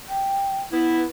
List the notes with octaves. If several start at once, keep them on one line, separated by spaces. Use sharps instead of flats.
G5
B3 E4 B4